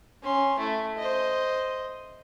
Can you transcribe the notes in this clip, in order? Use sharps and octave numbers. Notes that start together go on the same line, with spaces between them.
C#4 C6
A3 E4
C5 D#5